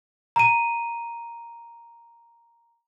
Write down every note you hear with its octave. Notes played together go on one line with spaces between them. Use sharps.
A#5 D#7